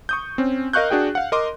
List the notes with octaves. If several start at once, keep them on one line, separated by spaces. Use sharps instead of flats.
C#6 D#6 G6
C4 C#4
A#4 D#5 F5 C#6 F#6 G6
D4 F#4 G#4 G5
F5 F#5
A#4 D#5 C6 D6